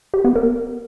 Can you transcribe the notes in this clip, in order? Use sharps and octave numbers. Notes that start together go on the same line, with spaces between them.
G4
B3
A#4